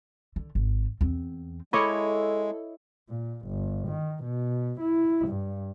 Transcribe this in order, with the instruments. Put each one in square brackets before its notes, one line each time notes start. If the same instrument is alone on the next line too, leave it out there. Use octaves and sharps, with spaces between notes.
[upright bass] D3
G#1
E2 C4
[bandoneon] G#3 [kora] E4 C#5 D#5 [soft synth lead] A4 [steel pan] B5 C#6 D6
[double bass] A#2
G1
D#3
B2
E4
G2